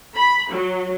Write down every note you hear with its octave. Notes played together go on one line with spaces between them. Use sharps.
B5
F#3